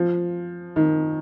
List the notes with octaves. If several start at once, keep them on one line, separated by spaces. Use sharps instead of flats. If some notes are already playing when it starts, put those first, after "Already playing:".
Already playing: F3
D#3